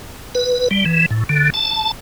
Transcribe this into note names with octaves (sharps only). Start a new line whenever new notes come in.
B4
G3
E3
A2
D3
A5